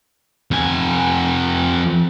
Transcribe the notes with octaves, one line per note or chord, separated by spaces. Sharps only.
F2 G#5